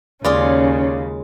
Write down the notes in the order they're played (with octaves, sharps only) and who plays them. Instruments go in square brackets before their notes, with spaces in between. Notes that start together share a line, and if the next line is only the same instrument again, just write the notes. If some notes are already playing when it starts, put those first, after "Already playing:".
[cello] D#2 C#3 [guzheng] G#3 F4 G#4 [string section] C#4 [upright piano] D5